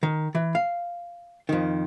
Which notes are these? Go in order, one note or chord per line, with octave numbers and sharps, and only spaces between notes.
D#3
E3
F5
F2 D#3